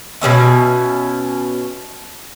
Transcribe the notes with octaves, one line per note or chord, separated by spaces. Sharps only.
B2 G3 C#4 E5